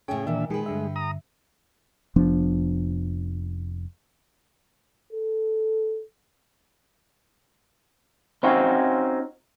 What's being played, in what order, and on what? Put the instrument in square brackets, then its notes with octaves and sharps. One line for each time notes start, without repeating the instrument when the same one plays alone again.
[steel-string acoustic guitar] A2 C#3 G5 [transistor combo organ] C#4 G#4
[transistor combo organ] A#2 D4 E5 [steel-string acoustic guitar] D#3 E3
[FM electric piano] A#2 D#3 G#4 [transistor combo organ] G#3 [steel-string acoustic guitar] G4 B4
[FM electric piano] G2 D3 E5
[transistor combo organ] A#5 D#6
[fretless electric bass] F1 F3 B3 D4
[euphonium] A4
[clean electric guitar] C4 C#4 D#4 F4 F#4